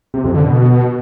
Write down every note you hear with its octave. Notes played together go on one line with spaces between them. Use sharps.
C3
F2
D3
B2